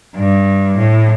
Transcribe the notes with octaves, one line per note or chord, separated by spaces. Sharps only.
G2
A2